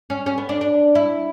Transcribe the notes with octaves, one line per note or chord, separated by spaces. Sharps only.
C#4
C#4
B3
D4
D4
E4